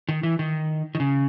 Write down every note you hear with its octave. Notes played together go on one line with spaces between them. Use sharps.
D#3
E3
D#3
D#3
C#3